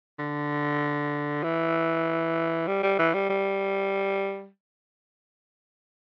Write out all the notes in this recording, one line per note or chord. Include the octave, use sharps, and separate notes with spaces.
D3
E3
G3
G3
E3
G3
G3